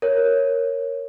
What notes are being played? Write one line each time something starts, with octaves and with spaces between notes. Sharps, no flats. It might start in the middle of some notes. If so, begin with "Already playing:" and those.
A#4 C#5